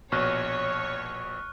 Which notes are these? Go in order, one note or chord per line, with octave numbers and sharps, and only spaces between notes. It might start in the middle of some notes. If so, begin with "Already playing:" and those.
A#1 B2 C#5 C#6 F6 F#6